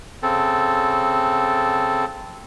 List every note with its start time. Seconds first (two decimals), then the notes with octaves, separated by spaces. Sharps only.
0.23 C#3 C4 A4